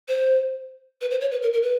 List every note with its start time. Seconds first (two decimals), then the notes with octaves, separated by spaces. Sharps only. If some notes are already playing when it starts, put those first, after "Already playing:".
0.08 C5
1.01 B4
1.11 C5
1.21 C#5
1.32 B4
1.42 A#4
1.53 A#4
1.63 B4